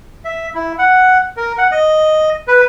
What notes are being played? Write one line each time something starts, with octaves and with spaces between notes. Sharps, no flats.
E5
E4
F#5
A#4
F#5
D#5
B4